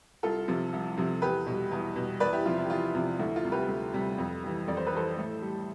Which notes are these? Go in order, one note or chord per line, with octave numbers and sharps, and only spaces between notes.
C2 F4 A4
C3 F3
C2
C3 F3
E2 G4 B4
B2 G3
E2
B2 G3
E2 B4 D5
E4 G4
C3 F3 F4
E4
G4
E2 F4
C3 F3
D2 E4
F4
C3 G3
G4 B4
D2
C3 G3
F2
E3 G3
F2 D5
C5
B4
E3 G3 A4 C5
A2
G3